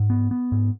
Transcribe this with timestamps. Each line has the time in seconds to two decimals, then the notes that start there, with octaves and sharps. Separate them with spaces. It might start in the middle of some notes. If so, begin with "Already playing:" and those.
Already playing: G#2
0.10 B3
0.31 B3
0.52 G#2